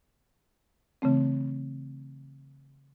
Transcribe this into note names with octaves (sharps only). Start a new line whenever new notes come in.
C#3 E3 A3 C4